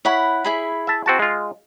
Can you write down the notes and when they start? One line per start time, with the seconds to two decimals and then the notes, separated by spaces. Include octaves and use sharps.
0.05 E4 C#5 F#5 B5
0.45 E4 G#4 B5
0.87 E5 A5
1.06 C4 F#4 A5
1.19 G#3 F4